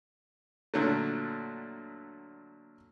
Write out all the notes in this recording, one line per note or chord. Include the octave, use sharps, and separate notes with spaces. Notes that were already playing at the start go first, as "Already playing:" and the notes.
A#2 D3 F#3 A3